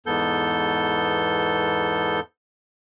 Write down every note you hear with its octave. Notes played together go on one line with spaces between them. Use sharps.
E2 G#2 B3 A4 G6